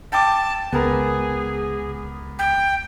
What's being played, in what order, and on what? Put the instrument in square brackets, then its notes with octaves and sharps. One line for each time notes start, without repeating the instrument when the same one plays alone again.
[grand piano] G5 D6 [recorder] A5
[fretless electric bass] C#2 [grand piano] B3 A#4 [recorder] G#4
[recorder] G5